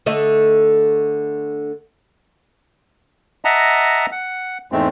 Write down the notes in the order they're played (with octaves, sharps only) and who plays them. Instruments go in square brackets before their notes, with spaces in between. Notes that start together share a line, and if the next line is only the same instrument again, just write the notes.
[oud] D3 A3 D#5
[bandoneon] D#5 E5 F#5 A5 A#5
F#5
E2 G#2 G#3 A3 C4